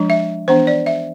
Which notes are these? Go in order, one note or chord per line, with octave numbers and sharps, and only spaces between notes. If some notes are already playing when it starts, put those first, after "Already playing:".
Already playing: F3 G#3 D4
E5
E3 B3 D4 C5
D5
E5